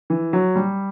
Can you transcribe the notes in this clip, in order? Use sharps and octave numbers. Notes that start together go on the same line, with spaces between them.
E3
F#3
G3